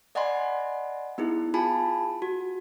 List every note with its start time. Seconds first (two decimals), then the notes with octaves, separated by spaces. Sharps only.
0.15 D5 D#5 F#5 G#5 B5 C6
1.18 B3 D#4 E4 G#4
1.54 F4 G#4 G#5 A5 B5
2.22 F#4